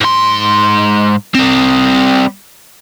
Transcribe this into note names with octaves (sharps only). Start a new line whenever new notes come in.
G#2 C6
G3 C4